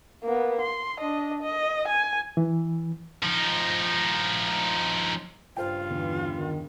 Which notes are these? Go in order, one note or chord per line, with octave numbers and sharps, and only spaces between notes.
A#3 B3
C6
D4 D#5
D#5
G#5
E3
F3 D#4
G2 C#3 F4 C5 G5
E2 D3 E3 B3
D#3